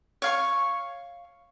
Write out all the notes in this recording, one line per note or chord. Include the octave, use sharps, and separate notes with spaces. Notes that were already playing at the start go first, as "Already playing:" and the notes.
C#5 F5 C#6